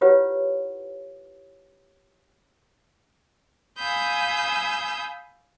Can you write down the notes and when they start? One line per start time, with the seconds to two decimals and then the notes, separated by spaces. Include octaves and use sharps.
0.01 E4 F4 G4 B4 C#5 F#5
3.78 F5 G#5 B5 D#6 E6 G6